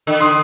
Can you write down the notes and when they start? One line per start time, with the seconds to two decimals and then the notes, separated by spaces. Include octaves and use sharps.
0.07 D3
0.20 C6 D#6